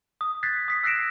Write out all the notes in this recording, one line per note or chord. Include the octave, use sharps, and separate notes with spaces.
D#6
F#6 G#6 A6 B6 C7
D#6 B6 C7
E6 F#6 A#6 C7 D7 E7